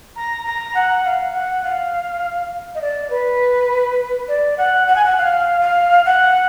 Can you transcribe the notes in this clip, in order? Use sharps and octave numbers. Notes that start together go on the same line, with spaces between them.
A#5
A#5
F#5
F5
F#5
F5
D#5
D5
B4
D5
F#5
F#5
G#5
F#5
F5
F5
F#5